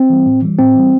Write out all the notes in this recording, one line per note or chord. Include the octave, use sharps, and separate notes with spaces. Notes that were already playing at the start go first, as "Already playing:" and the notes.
Already playing: C4
E3 G3
A2
E3 G3
A2 C4
E3 G3